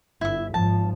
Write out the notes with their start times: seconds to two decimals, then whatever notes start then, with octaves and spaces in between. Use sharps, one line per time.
0.21 G1 E4 E5
0.54 G#1 F3 A5